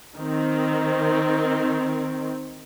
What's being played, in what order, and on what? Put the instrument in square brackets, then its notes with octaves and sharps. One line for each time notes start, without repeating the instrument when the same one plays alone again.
[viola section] D#3 C4